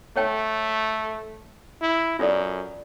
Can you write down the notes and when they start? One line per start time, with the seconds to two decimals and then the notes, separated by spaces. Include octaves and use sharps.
0.16 A3 C#5 G5 A5
1.82 E4
2.19 F#2 F4 A4 D5